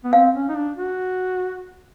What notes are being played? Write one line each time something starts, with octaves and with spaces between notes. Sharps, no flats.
B3
C4 F5
C#4
D#4
D4
F#4